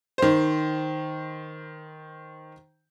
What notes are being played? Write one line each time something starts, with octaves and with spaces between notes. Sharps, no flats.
D#3 C5